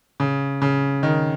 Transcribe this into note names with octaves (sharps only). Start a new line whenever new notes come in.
C#3
C#3
D#3